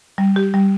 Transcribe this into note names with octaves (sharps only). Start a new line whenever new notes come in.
G3
G4
G3